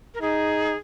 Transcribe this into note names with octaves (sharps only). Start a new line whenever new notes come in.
A#4
D#4 G#4